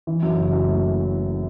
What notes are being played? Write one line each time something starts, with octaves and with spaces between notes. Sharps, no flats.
E3
F#2
F#1
F#2
A3